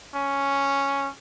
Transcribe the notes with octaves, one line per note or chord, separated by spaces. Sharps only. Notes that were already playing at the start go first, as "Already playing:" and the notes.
C#4